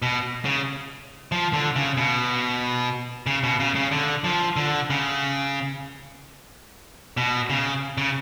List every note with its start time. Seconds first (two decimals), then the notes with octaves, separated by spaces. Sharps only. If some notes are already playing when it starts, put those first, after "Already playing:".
0.02 B2
0.45 C#3
1.32 F3
1.53 D3
1.76 C#3
1.97 B2
3.26 C#3
3.43 B2
3.60 C#3
3.75 C#3
3.91 D3
4.24 F3
4.56 D3
4.90 C#3
7.17 B2
7.50 C#3
7.98 C#3